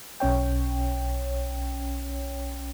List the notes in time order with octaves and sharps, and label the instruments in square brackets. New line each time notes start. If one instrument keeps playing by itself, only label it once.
[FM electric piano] B1 C#4 C#5 G5